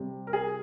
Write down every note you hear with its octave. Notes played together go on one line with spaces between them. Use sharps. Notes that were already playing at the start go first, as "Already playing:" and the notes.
Already playing: C3 G3
A#4
G#4